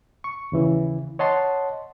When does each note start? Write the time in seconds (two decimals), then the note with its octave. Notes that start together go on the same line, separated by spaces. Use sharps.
0.24 C#6
0.52 D#2 C#3 E3
1.19 C#5 D#5 F#5 A5 C6